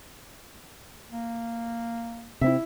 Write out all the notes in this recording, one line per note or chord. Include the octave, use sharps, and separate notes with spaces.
A#3
C3 C4 E4 E5